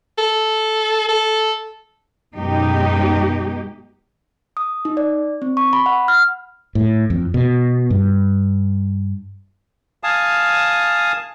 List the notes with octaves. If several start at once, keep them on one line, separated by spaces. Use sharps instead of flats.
A4
A4
F#2 B2 G#3 D#4 G4
D#6
D#4
D5
C4
C#6
B5
F#5
F6
A2
F2
B2
G2
F5 G#5 A5 D#6